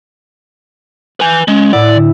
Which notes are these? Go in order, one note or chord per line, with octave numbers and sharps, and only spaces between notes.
B4 G#5 G6
G#3 C#4
A2 E4 D5 F#5
D3